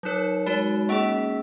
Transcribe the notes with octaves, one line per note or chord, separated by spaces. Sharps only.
F#3 D#4 A#4 C#5
G#3 D#4 F#4
A#3 C#4 G#4